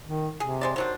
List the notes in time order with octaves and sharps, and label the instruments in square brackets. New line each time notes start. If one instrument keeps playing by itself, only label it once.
[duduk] D#3
[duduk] C3 [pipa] G#4
[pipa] G#3 C5 D5
[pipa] D#3 F#3 D4 [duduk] C5